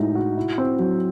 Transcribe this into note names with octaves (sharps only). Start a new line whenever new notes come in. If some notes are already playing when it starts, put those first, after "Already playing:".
Already playing: A2 G#3 D#4 F#4
F#4
E4
C4
F#3